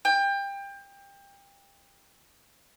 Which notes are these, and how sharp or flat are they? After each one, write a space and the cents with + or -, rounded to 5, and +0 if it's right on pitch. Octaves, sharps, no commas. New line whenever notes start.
G5 +25